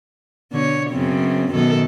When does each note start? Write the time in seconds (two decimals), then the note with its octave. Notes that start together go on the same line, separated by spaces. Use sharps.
0.52 B2 D3 C#5
0.91 F#2 C#3 B3 C4
1.53 F#2 B2 D#3 A4